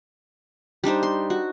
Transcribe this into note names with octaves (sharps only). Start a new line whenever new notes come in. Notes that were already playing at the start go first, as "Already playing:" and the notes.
G3 D4 D#4 C5
C6
F#4